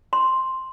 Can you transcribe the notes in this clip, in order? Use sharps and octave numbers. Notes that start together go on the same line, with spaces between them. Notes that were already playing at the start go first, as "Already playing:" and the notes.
C6